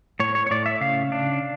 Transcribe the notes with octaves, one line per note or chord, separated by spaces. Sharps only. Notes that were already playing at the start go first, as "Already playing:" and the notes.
A2 C#5
C#5
C#5
A2 D5
E5
C#3 F5
D4